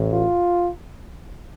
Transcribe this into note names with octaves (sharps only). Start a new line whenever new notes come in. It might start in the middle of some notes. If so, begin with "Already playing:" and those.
Already playing: A1 A2
F4